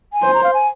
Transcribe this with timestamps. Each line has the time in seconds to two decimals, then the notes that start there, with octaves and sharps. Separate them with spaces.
0.13 G#5
0.23 C5
0.34 A#5
0.44 F5
0.54 G#5